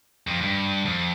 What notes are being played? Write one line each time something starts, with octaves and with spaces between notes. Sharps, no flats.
F2
G2
F2